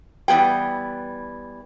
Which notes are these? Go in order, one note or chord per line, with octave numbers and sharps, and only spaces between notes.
E3 G3 B3 G#4 G5